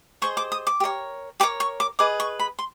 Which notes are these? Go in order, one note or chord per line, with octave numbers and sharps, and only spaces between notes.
G#4 C5 D#5 C#6
D6
D#6
D6
G4
A#4 C#5
G4 A#4 C#5 D6
C#6
D6
G#4 B4 D#5 D6
C#6
B5
C6